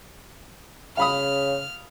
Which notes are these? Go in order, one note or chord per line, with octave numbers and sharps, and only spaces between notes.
C#3 F5 B5 D#6 F6